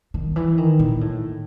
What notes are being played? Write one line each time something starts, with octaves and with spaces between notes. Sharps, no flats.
D#3
E3
D#3
A#2
A2